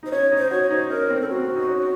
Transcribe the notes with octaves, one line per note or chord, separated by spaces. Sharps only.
D#4 C5
C#4 C#5
D#4
C5
F#4 C#5
D#4 C5
C#4 A#4
C4
A4
C4 F#4
C4
D#4
C#4